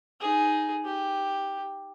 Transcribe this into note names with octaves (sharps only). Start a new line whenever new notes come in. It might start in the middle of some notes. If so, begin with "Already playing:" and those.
D#4 G#4
G4